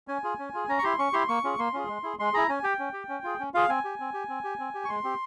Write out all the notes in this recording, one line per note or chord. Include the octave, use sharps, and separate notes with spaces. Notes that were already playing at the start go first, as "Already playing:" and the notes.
C#4 G#5
F4 G#4
C#4
F4 G#4
C#4 A#5
C#6
E4 G4 C6
C#4 C#6
E4 G4 C6
A#3 C#6
C#4 F4 G#4
A#3 C6
C#4 F4 G#4
G#3
E4 G#4
G#3 C6
E4 G#4 A#5
C#4 G#5
G4 G5
C#4
G4
C#4
F4 G#4
C#4
F4 G#4 F5
C4 G#5
G4
C4
G4
C4
G4
C4
G4
C#6
G#3 C6
C4 G4